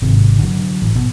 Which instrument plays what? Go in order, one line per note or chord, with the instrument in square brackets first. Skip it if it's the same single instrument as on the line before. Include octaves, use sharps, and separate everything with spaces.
[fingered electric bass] G#1 C3
D3 F#3
A1
B2